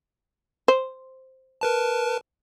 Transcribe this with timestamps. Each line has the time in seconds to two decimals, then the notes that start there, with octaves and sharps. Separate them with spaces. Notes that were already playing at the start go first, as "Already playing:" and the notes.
0.68 C5
1.61 A#4 B4 A5